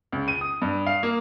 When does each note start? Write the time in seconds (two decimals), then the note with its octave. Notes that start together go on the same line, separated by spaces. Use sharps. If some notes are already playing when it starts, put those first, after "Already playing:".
0.12 C#2
0.28 D#7
0.41 D#6
0.62 G2
0.87 F5
1.03 A#3